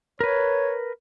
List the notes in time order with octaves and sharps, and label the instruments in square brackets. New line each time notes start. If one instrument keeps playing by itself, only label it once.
[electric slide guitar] A#4 B4 [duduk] C#5